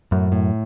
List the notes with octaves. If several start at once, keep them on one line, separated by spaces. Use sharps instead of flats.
F#2 A2
A2